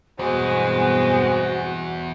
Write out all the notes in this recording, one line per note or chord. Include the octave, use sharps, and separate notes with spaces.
E2 G2 B2 G#3 C4 F#4